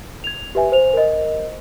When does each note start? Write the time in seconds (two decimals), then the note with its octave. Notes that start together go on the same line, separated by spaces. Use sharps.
0.24 G#6 F7
0.55 G4 B4 E5 G#5
0.72 C5 F7
0.93 A#4 D#5